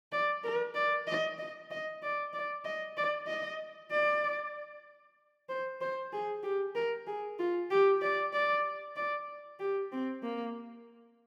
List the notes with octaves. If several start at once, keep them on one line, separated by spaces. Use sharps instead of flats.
D5
A#4
D5
D#5
D#5
D#5
D5
D5
D#5
D5
D#5
D5
C5
C5
G#4
G4
A#4
G#4
F4
G4
D5
D5
D5
G4
C4
A#3